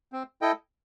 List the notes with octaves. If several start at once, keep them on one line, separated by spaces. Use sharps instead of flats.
C4
E4 A4 D#5 G5